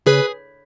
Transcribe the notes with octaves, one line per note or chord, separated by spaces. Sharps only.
C#3 G#4 B4